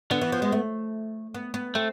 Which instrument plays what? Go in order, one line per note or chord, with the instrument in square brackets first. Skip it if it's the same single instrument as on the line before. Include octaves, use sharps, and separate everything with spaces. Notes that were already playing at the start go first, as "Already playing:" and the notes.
[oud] D3 [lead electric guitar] B3
[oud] E3
F3
G#3
A3
B3
B3
[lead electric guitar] A3 [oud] C4